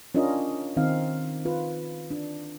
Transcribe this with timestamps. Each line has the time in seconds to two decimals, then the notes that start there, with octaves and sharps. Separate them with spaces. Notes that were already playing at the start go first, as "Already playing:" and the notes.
0.15 C#4 D4 F4 A#4 D#5
0.77 D#3 C4 D#4 F5
1.45 F4 B4
2.11 D4